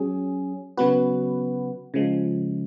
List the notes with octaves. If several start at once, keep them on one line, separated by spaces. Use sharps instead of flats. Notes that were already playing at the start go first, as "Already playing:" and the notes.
Already playing: F#3 C#4 G#4
C#3 F#3 B3 F#4 B4
C#3 F3 G#3